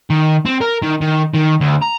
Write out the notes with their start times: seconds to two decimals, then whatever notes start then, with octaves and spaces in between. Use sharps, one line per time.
0.10 D#3
0.45 C4
0.61 A#4
0.82 D#3
1.01 D#3
1.34 D#3
1.60 D2
1.82 A#5